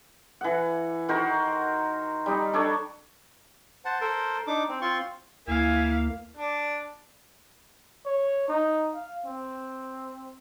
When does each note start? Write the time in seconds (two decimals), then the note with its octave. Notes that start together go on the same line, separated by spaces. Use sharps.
0.41 E3 F#5
1.09 D#3 F#4 A#4 C5
2.26 G3 D#4
2.53 D4 A4 C#5
3.85 C5 F#5 A5
4.01 A4 A#4 C5
4.47 D4 D#4 D6
4.69 C4
4.82 C4 F4 C6 C#6
5.47 D2 A#3 E4 F5 G#5
6.36 D4
8.05 C#5
8.48 D#4
8.94 F5
9.26 C4